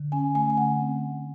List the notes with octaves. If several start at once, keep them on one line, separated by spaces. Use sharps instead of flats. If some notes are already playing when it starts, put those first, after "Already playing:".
Already playing: D3
C#4 G#5
A3 G#5
G#5
D3 F#5
C4
A3